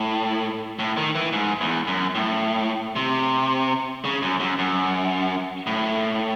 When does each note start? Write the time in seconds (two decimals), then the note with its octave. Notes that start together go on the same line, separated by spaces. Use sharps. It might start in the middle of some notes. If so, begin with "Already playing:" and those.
Already playing: A2
0.79 A2
0.97 D#3
1.15 E3
1.33 G#2
1.61 E2
1.87 F#2
2.15 A2
2.96 C3
4.05 C#3
4.22 F#2
4.40 F#2
4.59 F#2
5.67 A2